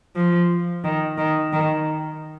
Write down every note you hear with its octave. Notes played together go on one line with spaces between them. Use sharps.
F3
D#3
D#3
D#3